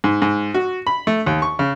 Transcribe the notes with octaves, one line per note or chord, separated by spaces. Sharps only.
G#2
G#2
F#4
B5
A3
D#2
C#6
C#3